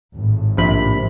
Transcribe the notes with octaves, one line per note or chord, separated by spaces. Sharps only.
G#1 A2
A#1 C3 B5